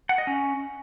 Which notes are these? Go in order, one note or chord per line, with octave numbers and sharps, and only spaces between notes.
F#5
D#5
C#4